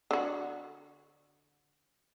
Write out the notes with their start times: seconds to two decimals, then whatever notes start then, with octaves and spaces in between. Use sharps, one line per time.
0.11 D3 F#4